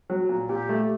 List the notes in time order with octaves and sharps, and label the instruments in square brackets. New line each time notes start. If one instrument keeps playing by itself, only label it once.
[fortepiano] F#3
A#2
[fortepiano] A#2 [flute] G4
[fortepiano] A3